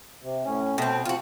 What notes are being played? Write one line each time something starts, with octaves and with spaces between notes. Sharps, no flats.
C3
A2 C#4
B2 A3 C4 G5
F3 C4 F4 F#4